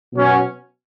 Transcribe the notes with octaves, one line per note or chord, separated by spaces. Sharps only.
B2 F#3 C#4